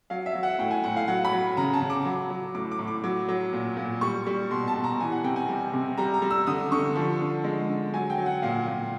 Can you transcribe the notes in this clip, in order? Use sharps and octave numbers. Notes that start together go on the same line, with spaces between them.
F#3 F5
E5
F#3
F#5
A2 G5
G#5
A2 F#5
F5
F#3 F#5
B5
F#3
C#3 A#5
A5
C#3
D6
F#3
F#3
A2 D6
D6
A2
D6
F#3 D6
F#3
A#2
A#2
G3 C#6
G3
B2 C6
A5
B2
A#5
E3 G#5
F#5
C3 G5
G#5
G3
C3
G3 A#5
A#5
G3
E6
D3 D#6
D3 C#6
F3
D3
G#3
D3
F#3 G#5
G5
F#3
F#5
A#2 F5
A#2